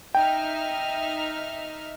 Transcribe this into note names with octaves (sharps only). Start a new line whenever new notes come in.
D#4 E5 G5 F6